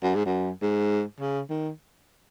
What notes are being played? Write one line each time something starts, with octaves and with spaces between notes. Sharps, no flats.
F#2
G#2
F#2
G#2
C#3
D#3